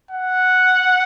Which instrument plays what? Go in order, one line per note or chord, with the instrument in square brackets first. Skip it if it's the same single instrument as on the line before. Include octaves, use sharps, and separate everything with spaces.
[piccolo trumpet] F#5